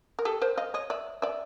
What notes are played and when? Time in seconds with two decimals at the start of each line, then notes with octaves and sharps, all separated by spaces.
0.19 A#4
0.25 G4 A4
0.42 A#4 C5
0.57 D#5 F5
0.74 C#5 D#5
0.90 D5 E5
1.22 D5 E5